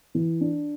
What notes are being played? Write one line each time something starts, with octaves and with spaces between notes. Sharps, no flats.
E3
D4